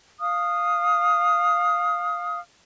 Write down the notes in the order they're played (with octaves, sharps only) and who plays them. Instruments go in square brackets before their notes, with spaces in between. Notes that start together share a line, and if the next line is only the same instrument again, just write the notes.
[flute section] F5 D#6 F6